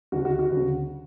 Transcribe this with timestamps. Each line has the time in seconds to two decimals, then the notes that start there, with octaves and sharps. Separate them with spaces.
0.12 D2 C#3 F#4
0.25 F#4
0.39 F#4
0.51 D2
0.56 C#3